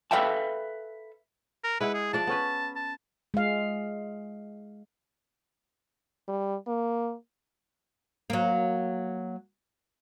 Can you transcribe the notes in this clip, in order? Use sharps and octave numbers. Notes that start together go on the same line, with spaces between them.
A4 B4 E5 F5 G5 A5
A#4
G#3 E4 B4 F#5
G#4
F3 D4 D5 A5
B3 C#4 B4
A5
G#3 F5
G3
A#3
F#3 A#3